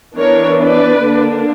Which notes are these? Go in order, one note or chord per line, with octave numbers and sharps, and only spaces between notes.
E3 B3 D4 A#4 C#5
B4 D5
D3 A#3 D4